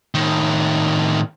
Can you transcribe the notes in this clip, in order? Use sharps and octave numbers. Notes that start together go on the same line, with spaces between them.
A2 D#3